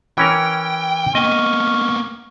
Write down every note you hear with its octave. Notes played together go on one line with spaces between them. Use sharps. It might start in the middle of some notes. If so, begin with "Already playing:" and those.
E3 C#4 A#4 G5
A#3 B3 D#5 C#6 F6